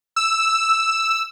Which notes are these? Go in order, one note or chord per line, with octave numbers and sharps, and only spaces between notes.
E6